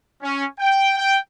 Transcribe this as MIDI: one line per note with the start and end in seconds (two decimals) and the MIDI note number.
0.22 0.45 61
0.59 0.96 79
0.98 1.18 79